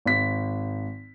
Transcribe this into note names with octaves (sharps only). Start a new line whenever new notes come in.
G#1 B6